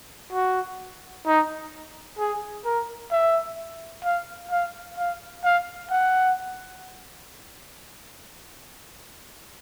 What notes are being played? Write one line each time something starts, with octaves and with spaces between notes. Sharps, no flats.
F#4
D#4
G#4
A#4
E5
F5
F5
F5
F5
F#5